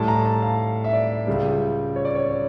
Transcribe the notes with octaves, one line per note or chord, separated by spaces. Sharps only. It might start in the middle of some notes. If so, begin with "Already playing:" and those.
Already playing: A2 G3 A5
A#5
A5
F5
E5
D5
C#2 C#3 G3
C#5
D5
C#5